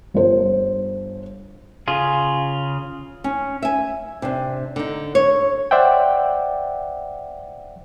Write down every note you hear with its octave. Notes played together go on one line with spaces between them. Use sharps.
G1 C5
C#3 F4 G#4
C#4
E5 G#5
C3 D4
D3 D#4
C#5
C5 D5 E5 F#5 G5